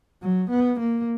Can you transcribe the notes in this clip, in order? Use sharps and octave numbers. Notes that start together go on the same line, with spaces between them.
F#3
B3
A#3